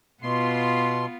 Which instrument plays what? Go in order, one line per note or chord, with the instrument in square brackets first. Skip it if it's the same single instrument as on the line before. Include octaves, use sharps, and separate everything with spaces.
[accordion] B2 C6 [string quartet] B3 F4